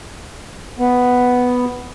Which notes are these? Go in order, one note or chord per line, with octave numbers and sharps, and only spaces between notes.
B3